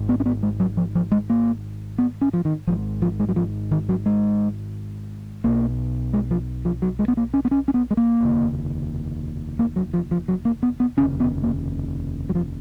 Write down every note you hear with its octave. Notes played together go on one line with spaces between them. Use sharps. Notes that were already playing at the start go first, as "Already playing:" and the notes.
Already playing: G#1 G#2
B3
C#4
B3
G#3
F#3
F3
F3
G#3
A#3
B3
C#4
F3
D#3
G#1 G#2 F3
F3
G#3
F#3
F3
D#3
F#3
G#3
B1 B2 A#3
G#3
F3
F3
F#3
G#3
B3
A#3
C#4
B3
C#4
C#4
B3
G#3
A#3
F1 D#2 C#3
A#3
F#3
F3
F3
F#3
A#3
B3
B3
F1 D#2 C#3 C#4
B3
A#3
F#3
F3